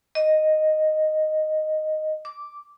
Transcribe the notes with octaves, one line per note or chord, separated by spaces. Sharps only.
D#5
D6